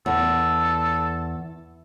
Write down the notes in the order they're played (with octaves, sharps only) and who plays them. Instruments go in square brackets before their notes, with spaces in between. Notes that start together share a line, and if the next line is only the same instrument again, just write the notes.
[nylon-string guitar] E2 [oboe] A4